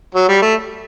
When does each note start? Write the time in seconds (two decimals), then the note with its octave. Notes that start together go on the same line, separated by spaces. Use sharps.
0.15 F#3
0.28 G3
0.42 A3